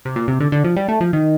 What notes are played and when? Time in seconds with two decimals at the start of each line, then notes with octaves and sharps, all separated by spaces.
0.05 C3
0.16 A#2
0.28 C3
0.40 D3
0.52 D3
0.64 F3
0.77 G3
0.88 A3
1.01 F3
1.13 D#3